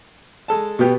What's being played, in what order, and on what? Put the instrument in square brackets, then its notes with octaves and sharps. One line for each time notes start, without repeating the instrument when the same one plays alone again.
[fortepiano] G#3 A4 A5
[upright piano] B2 B3 G4